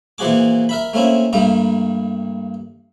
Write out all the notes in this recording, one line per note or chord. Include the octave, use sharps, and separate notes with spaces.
A#2 E3 F3 F#4 G#4 D6
A#4 E5 B5
A3 A#3 C4 C#4 E4
G2 G3 A3 A#3 A#5